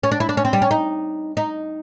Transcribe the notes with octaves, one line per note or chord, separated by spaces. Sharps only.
C#4
D4
E4
D4
C#4
C4
G3
C#4
D#4
D#4